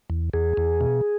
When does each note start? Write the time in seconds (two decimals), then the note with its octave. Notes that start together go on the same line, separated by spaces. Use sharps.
0.10 E2
0.33 E2 G#4
0.57 E2
0.81 B2